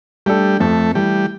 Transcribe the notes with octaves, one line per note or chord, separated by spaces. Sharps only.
G3 A3 D4 A4
F2 A3
E3 G3 A3